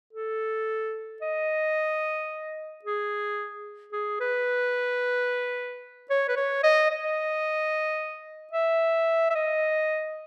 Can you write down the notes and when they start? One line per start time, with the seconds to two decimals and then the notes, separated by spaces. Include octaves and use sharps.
0.13 A4
1.22 D#5
2.84 G#4
3.92 G#4
4.20 B4
6.10 C#5
6.28 B4
6.36 C#5
6.63 D#5
6.91 D#5
8.53 E5
9.30 E5
9.35 D#5